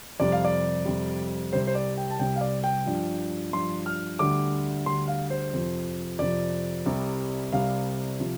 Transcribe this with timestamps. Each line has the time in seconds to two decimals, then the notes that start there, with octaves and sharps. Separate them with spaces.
0.20 F2 C3 G3 D5
0.32 F5
0.45 D5
0.86 F2 C3 G3
1.53 C2 C3 G3 C5
1.67 C5
1.75 D5
1.98 G5
2.11 A5
2.19 C2 C3 G3 G5
2.36 F5
2.41 D5
2.64 G5
2.86 G2 F3
3.53 G2 F3 C6
3.86 F6
4.19 D2 D3 G3 D6
4.86 D2 D3 G3 C6
5.08 F5
5.30 C5
5.53 F2 C3 F3
6.19 F2 C3 F3 D5
6.86 C2 C3 G3
7.52 C2 C3 G3 F5
8.20 C3 F3